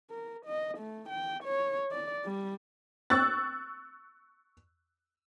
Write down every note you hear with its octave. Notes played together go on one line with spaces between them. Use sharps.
A#4
D#5
A3
G5
C#5
D5
G3
C#6 E6 F#6 A6